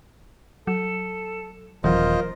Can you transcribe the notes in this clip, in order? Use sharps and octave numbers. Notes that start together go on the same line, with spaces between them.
F#3 A4
D#1 E3 F#3 F4 A#4 C5 D#5